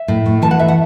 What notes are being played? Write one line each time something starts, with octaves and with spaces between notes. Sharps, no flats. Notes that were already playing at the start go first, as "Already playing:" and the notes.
Already playing: E5
A2
A3
E3 A5
F#5
A2 E5
F#5